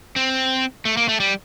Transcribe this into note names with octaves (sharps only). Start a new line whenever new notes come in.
C4
A3
A#3
A3
G3